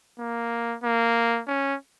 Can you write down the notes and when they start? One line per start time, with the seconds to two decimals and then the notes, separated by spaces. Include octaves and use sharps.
0.19 A#3
0.84 A#3
1.47 C#4